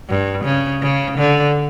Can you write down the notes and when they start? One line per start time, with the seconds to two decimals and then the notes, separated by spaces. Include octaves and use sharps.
0.09 G2
0.45 C#3
0.82 C#3
1.18 D3